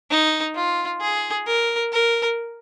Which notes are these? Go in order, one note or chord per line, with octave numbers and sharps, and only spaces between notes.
D#4
F4
G#4
A#4
A#4